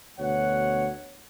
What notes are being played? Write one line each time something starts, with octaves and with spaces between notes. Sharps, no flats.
D2 B2 C#5 F#5